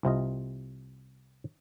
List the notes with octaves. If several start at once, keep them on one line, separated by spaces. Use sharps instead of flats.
C2 C3 F4 D#5